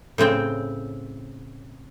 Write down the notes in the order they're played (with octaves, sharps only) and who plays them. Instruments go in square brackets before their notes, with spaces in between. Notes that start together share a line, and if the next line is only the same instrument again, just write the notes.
[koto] A2 C#3 C4 G5